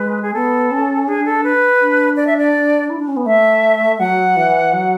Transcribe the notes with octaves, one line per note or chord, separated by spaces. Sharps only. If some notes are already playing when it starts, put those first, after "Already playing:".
Already playing: G#3 B4
G#4
B3 A4
C#4
D4 G#4
A4
B4
D4
D5
E5
D5
E4
D4
C#4
B3
A3 E5
F#3 F#5
E3
F#3